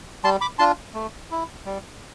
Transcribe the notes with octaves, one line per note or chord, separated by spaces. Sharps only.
G3 A5 C6
B5 D6
D4 F4 A5 C6
A3
E4
G3